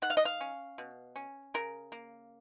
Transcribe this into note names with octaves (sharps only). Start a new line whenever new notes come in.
D#3 F#5
F5
D#5
F5
C#4
B2
C#4
C#3 A#4
A#3